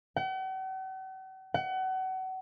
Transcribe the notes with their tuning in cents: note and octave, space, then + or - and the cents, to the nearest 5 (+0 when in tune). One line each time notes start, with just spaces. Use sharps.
F#5 +45
F#5 +30